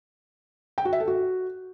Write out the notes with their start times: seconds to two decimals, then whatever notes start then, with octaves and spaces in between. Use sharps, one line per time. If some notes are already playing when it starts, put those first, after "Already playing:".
0.78 G5
0.85 F#4
0.93 E5
1.00 A4
1.07 F#4